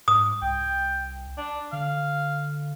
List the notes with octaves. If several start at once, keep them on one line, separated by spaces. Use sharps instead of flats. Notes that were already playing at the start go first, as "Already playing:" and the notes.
G#2 D#6
C2 G5
D4
D3 F5